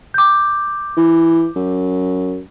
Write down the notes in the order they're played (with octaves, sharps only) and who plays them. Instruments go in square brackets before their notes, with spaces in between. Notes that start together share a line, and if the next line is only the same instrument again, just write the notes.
[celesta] D6 G6
[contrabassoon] E3
F#2